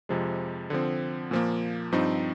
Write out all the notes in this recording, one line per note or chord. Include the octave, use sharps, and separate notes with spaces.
F2 C3 F3 G#3
D3 F3 C4
A#2 F3 A#3
G2 F3 C4 D#4